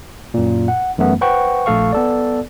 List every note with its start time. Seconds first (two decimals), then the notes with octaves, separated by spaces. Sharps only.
0.34 F#2 A#2
0.68 F#5
0.98 F#2 E3 A3 B3
1.21 B4 C5 F#5 G5 C#6
1.66 A#1 A3 A4 F5 C#6
1.93 B3 A4 D5